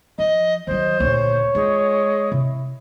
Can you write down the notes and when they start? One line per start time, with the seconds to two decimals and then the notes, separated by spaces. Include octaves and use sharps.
0.18 F3 D#5
0.67 D#3 F#3 C5 D#5
1.00 D2 A#2 C#5
1.55 G#3 F4
2.32 C3 E4